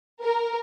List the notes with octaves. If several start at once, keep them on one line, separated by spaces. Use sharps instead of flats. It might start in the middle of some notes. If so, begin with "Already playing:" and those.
A#4